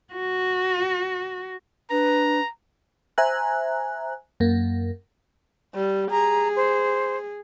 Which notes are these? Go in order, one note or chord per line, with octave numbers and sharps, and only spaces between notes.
F#4
D4 B4 A#5
C5 E5 G#5 A#5 F#6
F#2 A#3
G3
G#4 A#5
C5